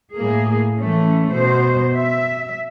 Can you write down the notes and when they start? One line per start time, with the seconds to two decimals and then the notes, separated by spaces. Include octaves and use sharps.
0.16 A2 A#3 G#4
0.79 E3 A3 C#4
1.31 B2 C5
1.95 E5